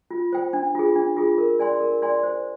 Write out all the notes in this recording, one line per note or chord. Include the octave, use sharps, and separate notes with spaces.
F4
C5 G5
D4
F4 G#4
D4
F4 G#4
A#4
D5 G#5 C6
A#4
D5 G#5 C6
C5